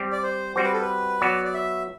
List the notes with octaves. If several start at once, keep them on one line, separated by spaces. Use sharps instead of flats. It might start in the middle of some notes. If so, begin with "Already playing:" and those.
Already playing: G3 C4 G4
D5
C5
G3 C4 F#4 C5
B4
A4
B4
F#3 B3 F#4 D5
D5
E5